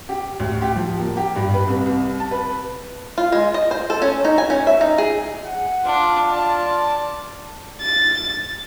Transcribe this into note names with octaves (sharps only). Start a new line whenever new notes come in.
G4
D2
G4
F3
A#3
G4
G2
B4
C2
C2
A5
B4
F4
G#3
D#5
C5
A4
C#4
D#4
G#5
C#4
E5
D#4
G#4
F#5
D4 F4
D5 A5
A6